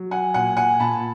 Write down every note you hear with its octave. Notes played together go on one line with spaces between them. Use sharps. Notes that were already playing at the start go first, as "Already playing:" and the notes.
Already playing: F#3
F#5 G#5
A#2 F#5 G#5
F#5 G#5
A#2 A5 B5